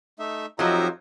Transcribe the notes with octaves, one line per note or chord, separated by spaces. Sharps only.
A3 D#4 E5
F2 F3 F#3 D#4 G4 E5 A#5